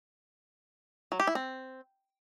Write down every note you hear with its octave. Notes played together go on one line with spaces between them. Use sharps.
F#3
G4
E4
C4